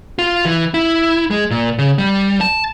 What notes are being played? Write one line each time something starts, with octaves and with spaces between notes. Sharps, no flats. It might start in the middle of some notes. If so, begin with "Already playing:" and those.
F4
E3
E4
G#3
A#2
C#3
G3
A5